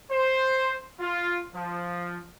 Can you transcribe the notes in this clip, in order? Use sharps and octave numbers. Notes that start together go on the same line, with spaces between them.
C5
F4
F3